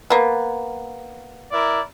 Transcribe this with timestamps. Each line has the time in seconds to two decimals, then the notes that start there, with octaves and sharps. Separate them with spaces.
0.10 A#3 B3
1.51 E4 A#4 D5